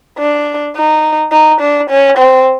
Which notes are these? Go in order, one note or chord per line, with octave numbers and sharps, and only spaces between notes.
D4
D#4
D#4
D4
C#4
C4